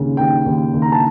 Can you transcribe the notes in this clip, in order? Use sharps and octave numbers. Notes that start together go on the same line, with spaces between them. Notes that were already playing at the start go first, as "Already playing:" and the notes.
Already playing: D#2 C#3
D#2 G5
D#2
D#2
A#5
A5